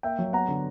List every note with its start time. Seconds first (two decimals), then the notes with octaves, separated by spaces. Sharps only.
0.03 A#3 E5 G5
0.19 F#3
0.33 B3 F#5 A#5
0.48 D3